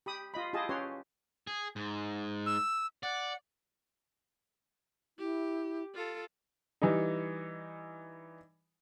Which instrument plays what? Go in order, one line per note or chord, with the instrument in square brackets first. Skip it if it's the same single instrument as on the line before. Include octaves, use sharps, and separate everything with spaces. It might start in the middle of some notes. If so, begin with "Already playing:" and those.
[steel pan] G4 B5 D#6
F4 D#5 B5
E4 F4 G4 G#4 D#5 A5
C#4 G4 B4 C#5 C6
[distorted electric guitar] G#4
G#2
[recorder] E6
[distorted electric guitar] D5 [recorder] F#5
[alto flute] E4 [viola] G4
[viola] F4 A4
[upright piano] E3 G3 D#4